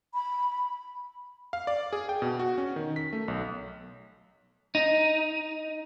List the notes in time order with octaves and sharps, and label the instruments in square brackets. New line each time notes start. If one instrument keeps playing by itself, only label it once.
[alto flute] B5
[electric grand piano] F5
D5
G#4
G5
B2
F#4
C#4
D#3
B6
A3
B1
[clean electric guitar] D#4